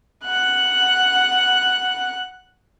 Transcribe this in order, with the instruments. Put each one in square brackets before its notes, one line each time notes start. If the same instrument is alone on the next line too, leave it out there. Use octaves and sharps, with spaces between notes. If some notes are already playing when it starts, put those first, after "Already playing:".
[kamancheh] F#5 F#6